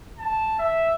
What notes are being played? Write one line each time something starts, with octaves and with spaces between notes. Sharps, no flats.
A5
E5